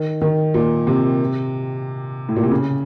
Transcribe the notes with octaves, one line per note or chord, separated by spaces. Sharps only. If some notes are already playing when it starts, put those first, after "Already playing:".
Already playing: D#3
D#3
A#2
C3
A2
A#2
C3
C#3